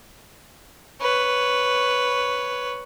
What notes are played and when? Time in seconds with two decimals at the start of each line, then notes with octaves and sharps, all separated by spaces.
1.01 B4 C#5